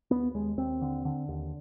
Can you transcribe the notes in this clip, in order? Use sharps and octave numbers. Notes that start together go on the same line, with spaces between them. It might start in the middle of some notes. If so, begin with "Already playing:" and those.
D#2 B3
D#2 G#3
D#2 C4
D3
D3
D#2